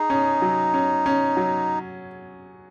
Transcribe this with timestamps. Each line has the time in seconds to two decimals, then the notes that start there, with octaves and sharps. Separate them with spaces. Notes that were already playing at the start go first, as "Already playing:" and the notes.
Already playing: D#4 G#4
0.10 C#4
0.42 F#3
0.74 C#4
1.06 C#4
1.37 F#3